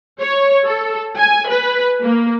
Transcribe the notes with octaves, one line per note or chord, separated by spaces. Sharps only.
C#5
A4
G#5
B4
A#3